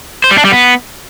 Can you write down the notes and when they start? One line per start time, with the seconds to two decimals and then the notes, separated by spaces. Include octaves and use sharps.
0.24 C5
0.31 G3
0.38 D4
0.45 G3
0.52 B3